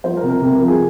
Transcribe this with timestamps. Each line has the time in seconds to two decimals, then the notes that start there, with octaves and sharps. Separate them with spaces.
0.04 F3 C5
0.17 A#4
0.23 C3
0.30 A#4
0.42 C3 A#4
0.55 A#4
0.61 F3
0.68 G#4